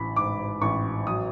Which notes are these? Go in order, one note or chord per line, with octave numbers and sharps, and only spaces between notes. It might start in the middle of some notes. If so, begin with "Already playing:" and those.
Already playing: A1 B5
G#2 D6
A1 C#6
F#3 D#6